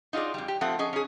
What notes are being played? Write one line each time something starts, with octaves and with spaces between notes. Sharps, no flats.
D#4 F4 F#4 G#4 D5
F2 G3
G4
F3 A3 C4 F#5
C#4 G#4 D#5
C#4 G#4